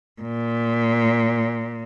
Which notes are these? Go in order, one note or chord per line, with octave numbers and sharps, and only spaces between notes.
A#2